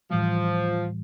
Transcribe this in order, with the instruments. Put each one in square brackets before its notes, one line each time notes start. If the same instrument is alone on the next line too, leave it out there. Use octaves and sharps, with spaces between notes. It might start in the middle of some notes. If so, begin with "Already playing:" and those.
[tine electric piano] A2 E3 G3 [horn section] F3